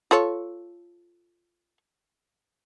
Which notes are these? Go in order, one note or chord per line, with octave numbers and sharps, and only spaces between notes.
F4 A4 C#5